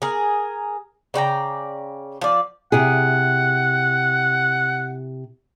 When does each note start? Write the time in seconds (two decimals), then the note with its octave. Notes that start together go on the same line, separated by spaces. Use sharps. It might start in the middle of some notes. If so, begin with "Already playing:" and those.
0.02 G#4 A#4
1.14 C#3 D5 G5 A#5
2.21 F3 D5
2.72 C3 E4 G#4 F#5